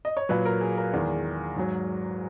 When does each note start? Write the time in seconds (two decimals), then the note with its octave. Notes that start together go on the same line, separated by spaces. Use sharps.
0.05 D#5
0.17 C#5
0.29 A#2 F#3 B4
0.45 A#4
0.61 G#4
0.77 A#4
0.93 E2 D#3 G#3
1.56 G#2 F#3